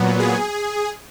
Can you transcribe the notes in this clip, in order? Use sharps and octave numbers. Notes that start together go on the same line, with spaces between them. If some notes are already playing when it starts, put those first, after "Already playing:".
Already playing: A#2 F#3 B3
G#4